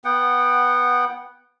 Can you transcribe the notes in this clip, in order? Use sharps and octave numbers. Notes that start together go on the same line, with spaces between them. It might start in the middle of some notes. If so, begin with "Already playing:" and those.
B3 F#5 G5